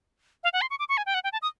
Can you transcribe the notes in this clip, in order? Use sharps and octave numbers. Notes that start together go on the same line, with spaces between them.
F5
F#5
C6
C#6
D6
C#6
G#5
G5
F#5
G5
A5
D#6